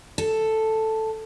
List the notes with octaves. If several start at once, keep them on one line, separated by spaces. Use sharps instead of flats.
A4